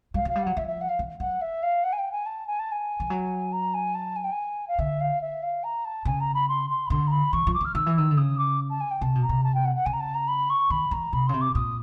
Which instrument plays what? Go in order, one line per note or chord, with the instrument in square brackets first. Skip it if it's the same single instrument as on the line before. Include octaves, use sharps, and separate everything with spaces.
[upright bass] G3 [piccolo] F5
[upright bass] F#3 [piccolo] F5
[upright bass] G3
[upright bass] F#3 [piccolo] F#5
[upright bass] F3 [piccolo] E5
[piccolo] E5
F#5
F5
[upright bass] E3
[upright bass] F#3 [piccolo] F#5
[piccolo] E5
F5
F#5
G#5
G5
G#5
A5
G#5
A5
G#5
[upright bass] F3
F#3
[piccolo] A#5
G#5
A5
G#5
G5
G#5
F5
[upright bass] D3 [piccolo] E5
[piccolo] F5
E5
F5
A#5
A5
[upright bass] C#3 [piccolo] G#5
[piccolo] A#5
B5
C6
C6
B5
[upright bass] D3 [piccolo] C6
[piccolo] A#5
B5
[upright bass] E3 [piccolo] C#6
[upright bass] F3
[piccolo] D6
[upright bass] E3 [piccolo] F6
[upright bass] D#3 [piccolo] E6
[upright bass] E3
[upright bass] D#3 [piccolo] E6
[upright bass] D3
[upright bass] C#3 [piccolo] D#6
[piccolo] D6
A5
G#5
G5
[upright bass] C3 [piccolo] A5
[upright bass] B2
[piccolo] A#5
[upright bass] C3
[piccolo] A5
G5
F#5
F#5
[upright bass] C#3 [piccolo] G#5
[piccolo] A#5
A5
A#5
B5
C#6
[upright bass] D#3 [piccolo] B5
[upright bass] E3 [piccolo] A#5
[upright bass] C3 [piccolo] B5
[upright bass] C#3 [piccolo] C6
[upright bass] C3
[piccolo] D6
[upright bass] A#2 [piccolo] D#6